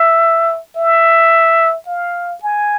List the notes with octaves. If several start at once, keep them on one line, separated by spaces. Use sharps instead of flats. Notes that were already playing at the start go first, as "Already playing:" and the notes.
Already playing: E5
E5
F5
G#5